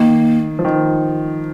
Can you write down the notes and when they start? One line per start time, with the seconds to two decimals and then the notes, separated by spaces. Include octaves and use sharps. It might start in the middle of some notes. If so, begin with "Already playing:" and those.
Already playing: D#3 A#3
0.59 F3
0.65 D#3